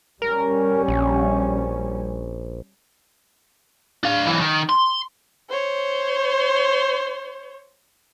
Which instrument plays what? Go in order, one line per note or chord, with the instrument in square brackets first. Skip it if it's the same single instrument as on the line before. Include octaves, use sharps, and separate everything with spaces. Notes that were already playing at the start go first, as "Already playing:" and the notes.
[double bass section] G3 C#4 [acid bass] A#4
[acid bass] A#1
[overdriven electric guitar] D4 F5
B1 E3
D#3
C6
[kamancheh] C5 C#5